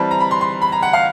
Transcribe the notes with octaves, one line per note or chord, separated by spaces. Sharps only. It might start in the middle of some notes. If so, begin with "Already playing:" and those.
Already playing: E3 G3 C4 A5
A#5
B5
C6
C6
B5
A#5
F#5
F5